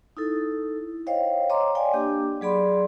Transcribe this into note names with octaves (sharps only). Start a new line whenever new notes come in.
D#4 E4 A4
C5 C#5 D#5 F5 G5
C#5 D#5 A#5 C6 D6
D5 F5 G5 G#5
A#3 D4 G4 D6
F#3 G#4 D5 B5 C6